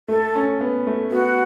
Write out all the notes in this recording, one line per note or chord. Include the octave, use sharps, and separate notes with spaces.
A3 A4
C#4
B3
A3
B3 F#4